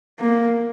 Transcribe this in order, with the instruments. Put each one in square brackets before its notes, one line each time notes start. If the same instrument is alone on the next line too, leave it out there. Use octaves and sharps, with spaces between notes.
[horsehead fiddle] A#3